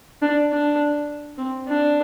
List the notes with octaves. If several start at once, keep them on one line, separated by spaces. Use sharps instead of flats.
D4
D4
C4
D4